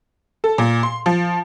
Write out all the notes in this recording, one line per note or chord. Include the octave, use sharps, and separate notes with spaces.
A4
A#2
C6
F3